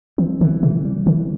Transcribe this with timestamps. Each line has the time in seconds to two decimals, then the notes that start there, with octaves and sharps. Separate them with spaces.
0.18 E3 C4
0.41 D3 E3
0.63 C3 E3
0.85 G3
1.06 D3 E3